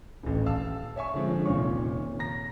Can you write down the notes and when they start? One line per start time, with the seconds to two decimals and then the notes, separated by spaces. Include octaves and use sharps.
0.23 D#1 A1
0.46 F5 A5 E6
0.96 C#5 E5 G#5 C#6
1.14 D3 F3 G#3 C4
1.45 F1 D#2 A#2 C#4 C#6
2.19 A#5 A#6